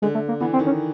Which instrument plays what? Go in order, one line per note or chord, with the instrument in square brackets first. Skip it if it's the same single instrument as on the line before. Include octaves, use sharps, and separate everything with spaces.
[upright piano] D3 [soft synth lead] G#3
[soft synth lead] A3
A#3
[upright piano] E3 [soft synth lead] B3
[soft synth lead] C4
[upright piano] D#3
[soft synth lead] C#4